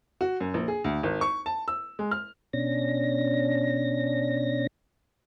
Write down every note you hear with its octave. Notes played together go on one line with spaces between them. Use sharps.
F#4
F#2
A#1
G#4
D2
G#1
C#6
A5
E6
G#3
F6
B2 C#4 D4 A#6